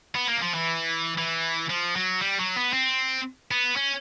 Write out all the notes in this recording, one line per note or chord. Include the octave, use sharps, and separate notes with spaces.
B3
A#3
F#3
F3
E3
E3
F3
F#3
G3
F#3
B3
C4
B3
C#4